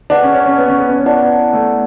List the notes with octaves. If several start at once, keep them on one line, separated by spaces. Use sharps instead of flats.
D4 G#4 B4 F#5 A5
C#4
C#4
C#4
B3
C#4
B3
C#4
B3
E4 B4 D5 F#5 A5
A3